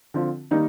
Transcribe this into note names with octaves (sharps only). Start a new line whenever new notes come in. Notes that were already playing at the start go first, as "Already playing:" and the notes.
D3 F3 C4 F4
D#3 G3 A#3 D#4